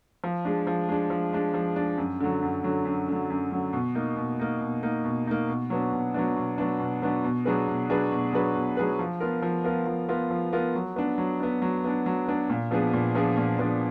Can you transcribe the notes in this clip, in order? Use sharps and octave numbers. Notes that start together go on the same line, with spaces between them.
F3
G#3 D4
F3
G#3 D4
F3
G#3 D4
F3
G#3 D4
F#2
D3 F#3
F#2
D3 F#3
F#2
D3 F#3
F#2
D3 F#3
B2
A#3 D#4
B2
A#3 D#4
B2
A#3 D#4
B2
A#3 D#4
B2
F#3 B3 D4
B2
F#3 B3 D4
B2
F#3 B3 D4
B2
F#3 B3 D4
B2
F#3 D4 G#4 B4
B2
F#3 D4 G#4 B4
B2
F#3 D4 G#4 B4
B2
F#3 D4 G#4 B4
F3
B3 F4 A#4
F3
B3 F4 A#4
F3
B3 F4 A#4
F3
B3 F4 A#4
F#3
B3 D4
F#3
B3 D4
F#3
B3 D4
F#3
B3 D4
A#2
F3 B3 D4 G#4
A#2
F3 B3 D4 G#4
A#2
F3 B3 D4 G#4